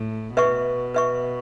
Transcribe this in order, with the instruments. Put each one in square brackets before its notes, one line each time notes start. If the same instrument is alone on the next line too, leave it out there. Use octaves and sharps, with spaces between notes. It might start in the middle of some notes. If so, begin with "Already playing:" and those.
Already playing: [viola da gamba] A2
[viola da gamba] B2 [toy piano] B4 E5 C#6
[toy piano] B4 E5 C#6